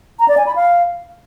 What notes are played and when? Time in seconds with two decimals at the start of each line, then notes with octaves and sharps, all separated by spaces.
0.19 A#5
0.28 D5
0.37 G#5
0.46 B5
0.56 F5